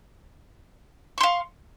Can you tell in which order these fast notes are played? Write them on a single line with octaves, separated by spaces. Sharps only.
C#6 C6 F5